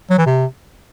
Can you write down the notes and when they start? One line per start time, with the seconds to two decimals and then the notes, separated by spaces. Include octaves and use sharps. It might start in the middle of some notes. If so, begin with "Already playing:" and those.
0.10 F#3
0.18 E3
0.26 C3